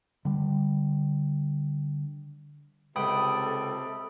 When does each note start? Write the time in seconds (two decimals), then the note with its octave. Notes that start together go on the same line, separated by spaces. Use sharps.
0.25 D3 G3
2.96 C#2 C3 A4 G5 B5 D#6 D7